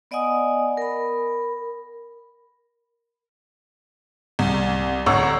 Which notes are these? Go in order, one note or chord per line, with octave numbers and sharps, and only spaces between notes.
B3 D5 D#5 F#5 G#5 D#6
A#4 B5
C2
A1 D2 C#5 F#5 A#5 E6